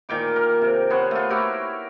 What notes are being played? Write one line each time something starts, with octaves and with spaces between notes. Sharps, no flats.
A#2 D#3 G5 D6
A#4
C3
B3 C5 C#5 F#5
A3 F4
E4 F#4 G4 A#4